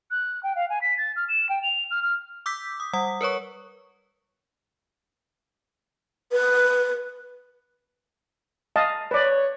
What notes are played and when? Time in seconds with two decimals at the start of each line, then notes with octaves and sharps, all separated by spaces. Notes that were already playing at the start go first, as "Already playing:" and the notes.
0.11 F#6
0.43 G5
0.56 F5
0.70 G#5
0.81 B6
0.97 A6
1.16 F6
1.29 E7
1.49 G5
1.63 F7
1.91 F6
2.03 F6
2.46 D6 E6 G6 B6
2.80 D#6
2.93 G3 F#5 D#6
3.21 A#4 B4 C#5 C#6
6.32 B4
8.76 D#5 F5 A5
9.11 B4 C#5 D5